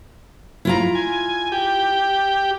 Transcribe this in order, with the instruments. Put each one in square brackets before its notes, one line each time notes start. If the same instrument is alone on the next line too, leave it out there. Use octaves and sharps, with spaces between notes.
[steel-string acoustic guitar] E4 F4 A#5
[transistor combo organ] G#5
G4